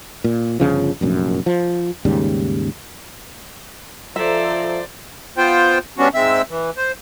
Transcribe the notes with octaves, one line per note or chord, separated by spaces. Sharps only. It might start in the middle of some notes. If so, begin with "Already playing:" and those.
A#2
G1 D2 C#3 F3
F1 A#1 F#2
F3
D#2 G#2 C#3 G3
F3 A4 C5 D5 E5 A#5
B3 F4 C5 G5
G3 B3 C#4 D4 F#4
G#2 G#3 C4 E5 E6
E3
C5